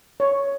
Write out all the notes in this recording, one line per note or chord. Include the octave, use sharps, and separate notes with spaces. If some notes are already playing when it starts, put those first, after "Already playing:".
C#5